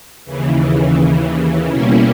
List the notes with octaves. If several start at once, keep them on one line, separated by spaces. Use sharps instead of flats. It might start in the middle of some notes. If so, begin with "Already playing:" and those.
D#2 C#3 E3
B2 G3 A#3 C#4 E4